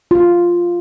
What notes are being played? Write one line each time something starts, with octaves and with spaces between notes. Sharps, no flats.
F4